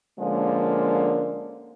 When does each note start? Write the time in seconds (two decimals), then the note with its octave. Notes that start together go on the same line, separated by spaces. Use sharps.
0.19 D3 F3 G#3 A#3 C#4